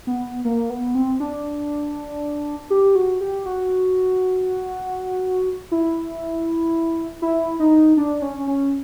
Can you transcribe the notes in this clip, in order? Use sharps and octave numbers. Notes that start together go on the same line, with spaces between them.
B3
A#3
B3
C4
D4
G4
F#4
G4
F#4
E4
E4
D#4
D4
C#4
C#4